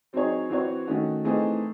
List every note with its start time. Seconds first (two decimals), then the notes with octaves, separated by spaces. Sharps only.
0.13 F#3 C4 D#4 G#4 C#5
0.50 E3 C4 F#4 C#5
0.87 D#3 A3 C#4 F#4
1.24 E3 A3 C4 D#4 G#4